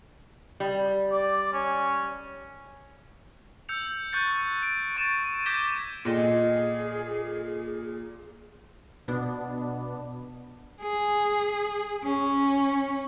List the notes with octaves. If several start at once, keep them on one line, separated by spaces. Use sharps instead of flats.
G3
D5
C#4
E6 G6 C#7 F7
C#6 F#6 G6 A6 C#7
D7
C#6 A6 D#7 E7
D6 G6 G#6 A#6 B6 G7
A#2 G#4 A4 D#5 G5
B2 B3 D4
G#4
C#4